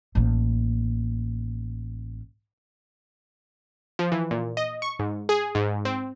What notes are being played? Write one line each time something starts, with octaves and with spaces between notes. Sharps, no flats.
A1 A#3
F3
E3
A#2
D#5
C#6
G#2
G#4
G#2
C4